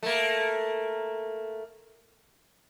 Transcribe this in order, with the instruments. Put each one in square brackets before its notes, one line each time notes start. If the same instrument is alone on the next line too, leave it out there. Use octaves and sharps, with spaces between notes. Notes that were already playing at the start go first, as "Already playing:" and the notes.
[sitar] A3 A#3